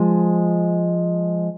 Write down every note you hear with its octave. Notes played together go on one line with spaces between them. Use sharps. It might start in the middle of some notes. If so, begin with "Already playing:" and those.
Already playing: F3 G#3